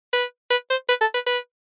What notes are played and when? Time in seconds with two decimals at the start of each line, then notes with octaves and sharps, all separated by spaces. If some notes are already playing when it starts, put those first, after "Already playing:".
0.13 B4
0.50 B4
0.70 C5
0.89 B4
1.01 A4
1.14 B4
1.26 B4